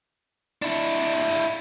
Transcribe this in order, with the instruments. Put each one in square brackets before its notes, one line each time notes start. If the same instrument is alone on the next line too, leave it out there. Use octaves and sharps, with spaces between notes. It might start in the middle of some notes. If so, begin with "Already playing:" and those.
[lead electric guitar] D4 E4